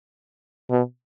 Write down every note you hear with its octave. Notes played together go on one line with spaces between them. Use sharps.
B2